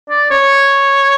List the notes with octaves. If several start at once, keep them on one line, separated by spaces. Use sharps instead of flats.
D5
C#5